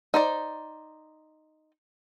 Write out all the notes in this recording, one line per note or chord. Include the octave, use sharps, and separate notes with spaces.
D#4 C5 D5